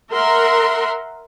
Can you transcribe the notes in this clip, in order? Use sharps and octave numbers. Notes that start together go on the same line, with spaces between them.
A#4 E5 F#5 C6